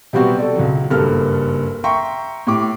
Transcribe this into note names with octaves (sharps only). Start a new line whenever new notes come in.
C3 F#3 G3 B3 C4 F#4
A4 D5
C#2 F#3
F#1 G2 A#3 A4 F6
E5 G5 A#5 C6 C#6
A2 G4 D6